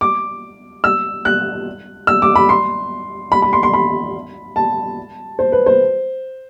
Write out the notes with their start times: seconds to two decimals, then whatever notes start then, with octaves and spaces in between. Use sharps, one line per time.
0.01 D6
0.84 E6
1.25 F#6
2.07 E6
2.22 D6
2.36 B5
2.49 C6
3.32 B5
3.42 B5
3.53 C6
3.63 C6
3.73 B5
4.56 A5
5.39 C5
5.52 B4
5.66 C5